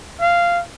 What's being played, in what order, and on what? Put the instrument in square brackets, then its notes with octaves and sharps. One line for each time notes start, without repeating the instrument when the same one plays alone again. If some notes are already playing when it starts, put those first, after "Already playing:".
[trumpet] F5